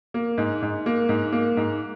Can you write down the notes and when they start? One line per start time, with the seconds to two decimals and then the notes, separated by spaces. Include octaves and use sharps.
0.14 A#3
0.38 G#2
0.62 G#2
0.86 A#3
1.09 G#2
1.33 A#3
1.57 G#2